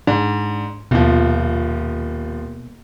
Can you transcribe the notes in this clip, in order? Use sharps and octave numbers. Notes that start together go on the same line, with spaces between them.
G#2 D4
D#1 B2 F3